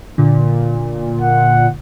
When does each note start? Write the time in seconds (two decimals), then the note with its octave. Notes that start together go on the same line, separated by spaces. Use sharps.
0.18 A#2 D3
1.21 F#5